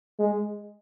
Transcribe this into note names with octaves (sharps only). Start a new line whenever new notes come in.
G#3